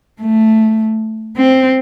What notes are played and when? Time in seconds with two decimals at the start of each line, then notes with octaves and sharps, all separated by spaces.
0.21 A3
1.37 C4